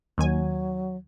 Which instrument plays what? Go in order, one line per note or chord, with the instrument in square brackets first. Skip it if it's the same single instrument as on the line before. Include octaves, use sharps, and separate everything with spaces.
[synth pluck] D#2 D#3 G#5 [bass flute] F#3